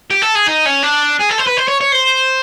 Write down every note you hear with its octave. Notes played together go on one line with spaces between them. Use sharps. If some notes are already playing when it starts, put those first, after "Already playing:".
G4
A4
G#4
D#4
C#4
D4
G#4
A4
C5
B4
C5
C#5
C#5
C5